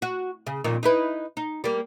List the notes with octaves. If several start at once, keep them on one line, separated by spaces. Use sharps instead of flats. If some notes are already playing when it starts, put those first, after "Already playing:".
F#4
C#3
F2 A#2 D#3
D#4 E4 B4
D#4
G3 A#3